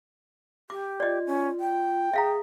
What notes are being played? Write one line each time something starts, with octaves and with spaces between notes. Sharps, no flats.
G4 D6
F4 D5 D#5
C#4
G5
G#4 E5 F5 A#5